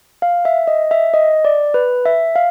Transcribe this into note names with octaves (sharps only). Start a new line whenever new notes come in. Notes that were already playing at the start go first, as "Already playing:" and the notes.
F5
E5
D#5
E5
D#5
D5
B4
E5
F5